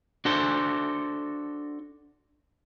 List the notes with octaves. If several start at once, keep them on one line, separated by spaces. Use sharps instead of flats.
D4 F#4 A4 C5